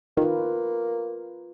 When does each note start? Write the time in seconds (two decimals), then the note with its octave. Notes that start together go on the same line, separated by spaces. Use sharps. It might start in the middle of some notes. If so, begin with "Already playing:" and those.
0.17 D#3 A#3 F4 B4